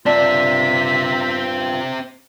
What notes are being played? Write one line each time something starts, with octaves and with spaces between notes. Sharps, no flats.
G2 C4 D4 F4 E5 B6